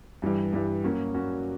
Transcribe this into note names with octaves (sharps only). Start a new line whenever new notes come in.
G2 E3 G3
G2 E3 G3
F#3 A#3 C#4 F#4
F#3 A#3 C#4 F#4